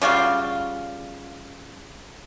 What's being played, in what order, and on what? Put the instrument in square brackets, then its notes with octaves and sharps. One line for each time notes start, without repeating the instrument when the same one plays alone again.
[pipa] C#3 G3 F4 F#4